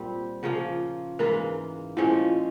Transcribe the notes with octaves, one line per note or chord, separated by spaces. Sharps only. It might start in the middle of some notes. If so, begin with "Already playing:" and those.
Already playing: A#2 G3 C4
C#3 F3 A#3 F4
G#2 E3 A#3 F4 A#4
A#2 F3 G#3 C#4 E4